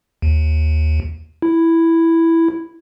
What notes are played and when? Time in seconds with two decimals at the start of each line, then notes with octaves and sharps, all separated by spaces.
0.22 D#2
1.42 E4